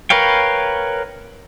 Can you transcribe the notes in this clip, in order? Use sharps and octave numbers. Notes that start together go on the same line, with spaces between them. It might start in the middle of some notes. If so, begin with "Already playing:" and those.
A#4 B4 C#5 F5 G5